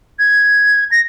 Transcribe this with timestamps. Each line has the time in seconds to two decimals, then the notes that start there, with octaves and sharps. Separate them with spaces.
0.19 G#6
0.91 A#6